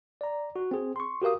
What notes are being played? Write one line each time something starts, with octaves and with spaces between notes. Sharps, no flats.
D5 A#5
F#4
C4 G#4
C6 C#6
F#4 G4 A#4 F5 D#6